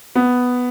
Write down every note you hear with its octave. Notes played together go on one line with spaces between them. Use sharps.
B3